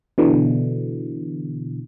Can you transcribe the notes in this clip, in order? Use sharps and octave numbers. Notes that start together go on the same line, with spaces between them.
B2 D3 E3